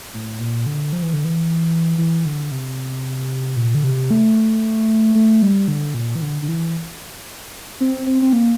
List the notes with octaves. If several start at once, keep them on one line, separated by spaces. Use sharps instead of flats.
A2
A#2
D3
F3
E3
D3
E3
E3
D3
C3
A#2
D3
C3
A3
A3
G3
D3
A#2
E3
D3
D3
E3
C4
C4
C4
A#3